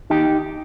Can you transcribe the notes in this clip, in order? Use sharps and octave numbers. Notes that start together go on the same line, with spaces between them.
D#2 D#4 G4